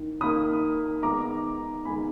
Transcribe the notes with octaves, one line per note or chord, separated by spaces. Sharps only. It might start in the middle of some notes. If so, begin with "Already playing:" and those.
Already playing: D#3 A#3
D#3 A#3 B5 D#6
D#3 G#3 B3 A#5 D6
D#3 G#3 B3 G#5 B5